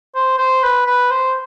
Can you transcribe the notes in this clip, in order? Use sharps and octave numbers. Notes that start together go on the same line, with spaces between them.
C5
C5
B4
B4
C5